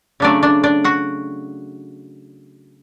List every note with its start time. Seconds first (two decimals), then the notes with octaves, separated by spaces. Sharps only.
0.20 C#3 F#3 A3 D4 D5
0.43 D4 D5
0.63 D4 D5
0.84 F#4 F#5